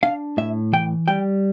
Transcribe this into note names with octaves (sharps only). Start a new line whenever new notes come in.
D4 F5
A2 E5
E3 G5
G3 G5